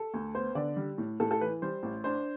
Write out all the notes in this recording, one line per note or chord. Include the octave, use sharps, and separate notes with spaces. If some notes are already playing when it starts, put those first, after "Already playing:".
Already playing: A4
D2
B3 C5
D3 D5
G3
A2
A2 A4
A4
E3 B4
G3 C5
A1
D4 C5